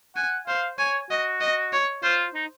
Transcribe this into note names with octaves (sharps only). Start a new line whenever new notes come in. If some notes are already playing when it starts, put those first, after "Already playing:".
F#5 G#5
C5 F5
C#5 G#5
F#4 D#5
D#5
C#5
F4 C5
D#4